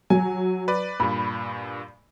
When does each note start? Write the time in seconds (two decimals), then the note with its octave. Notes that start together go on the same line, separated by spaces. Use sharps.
0.10 F#3 G#5
0.68 B4 D5
1.00 G2 A#2 B5